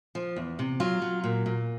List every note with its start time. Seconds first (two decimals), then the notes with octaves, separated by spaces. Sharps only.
0.15 F3
0.36 E2
0.59 C3
0.80 F#3 F4
1.02 F#3
1.24 A#2
1.46 A#2